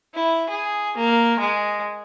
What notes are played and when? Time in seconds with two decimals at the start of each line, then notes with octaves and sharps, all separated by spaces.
0.15 E4
0.50 G#4
0.98 A#3
1.40 G#3